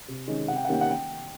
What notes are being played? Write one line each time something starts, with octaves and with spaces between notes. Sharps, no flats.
C3
D#3 G#3 C#4
C3 F#5
G5
F#5
D#3 G3 A#3 C#4 G5
F#5
G5